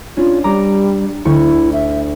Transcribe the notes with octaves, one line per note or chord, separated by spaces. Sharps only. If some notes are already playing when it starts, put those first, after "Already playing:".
C#4 D4 F4
G3 A#5 D6
D2 E4 C#6
E5